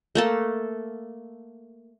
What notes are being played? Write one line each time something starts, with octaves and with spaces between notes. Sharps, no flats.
A3 A#3 A4